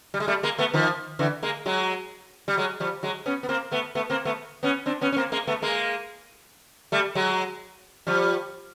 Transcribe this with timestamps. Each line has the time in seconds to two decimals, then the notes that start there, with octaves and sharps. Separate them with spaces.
0.14 G3
0.20 G#3
0.28 G3 A3
0.43 G#3 A#3
0.58 A3 B3
0.74 D#3 F3
1.19 D3 E3
1.43 G#3 A#3
1.66 F#3 G#3
2.48 G3
2.57 F#3 G#3
2.80 F3 G3
3.03 F#3 G#3
3.26 B3 C#4
3.43 B3
3.49 A#3 C4
3.71 A3 B3
3.95 A3 B3
4.10 A#3 C4
4.25 A3 B3
4.63 B3 C#4
4.86 C4 D4
5.01 B3 C#4
5.12 C#4
5.16 A#3 C4
5.32 G#3 A#3
5.47 A3 B3
5.62 G#3 A#3
6.92 G3 A3
7.15 F#3 G#3
8.07 F3 G3